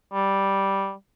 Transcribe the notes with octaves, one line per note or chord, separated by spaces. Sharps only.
G3